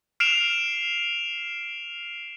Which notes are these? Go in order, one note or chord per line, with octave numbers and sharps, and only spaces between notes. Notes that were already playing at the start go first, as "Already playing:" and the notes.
F6 C7 D7 E7 F7